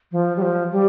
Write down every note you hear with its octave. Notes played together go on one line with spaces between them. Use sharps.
F3
G3
F3
G3